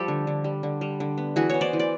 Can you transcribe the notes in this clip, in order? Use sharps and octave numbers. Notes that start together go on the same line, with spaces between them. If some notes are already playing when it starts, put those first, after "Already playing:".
Already playing: F3 G3 G4 A4
D3
D3
G3
D3
G3
D3
B3
E3 F#4 G#4
B3 C#5
C5 D5
E3
D5